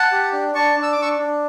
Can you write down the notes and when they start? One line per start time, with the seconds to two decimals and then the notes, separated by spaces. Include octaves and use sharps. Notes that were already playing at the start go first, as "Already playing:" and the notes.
Already playing: F#5 A5
0.12 G4
0.33 D4
0.55 D4 A5 C#6
0.76 D4
0.83 E6
0.92 D6
0.98 D4 C#6 E6
1.19 D4